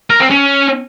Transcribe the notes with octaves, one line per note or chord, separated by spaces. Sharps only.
A#4
C4
C#4